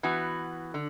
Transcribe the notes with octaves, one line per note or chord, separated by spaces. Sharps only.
E3 B3 F#4
D3